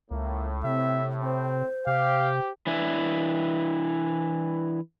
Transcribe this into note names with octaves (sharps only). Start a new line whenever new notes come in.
C#2 A2 A#3
C3 C4 E5
C4 C5
C3 G4 F5
E3 D4 E4